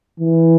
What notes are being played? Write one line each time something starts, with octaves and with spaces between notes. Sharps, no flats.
E3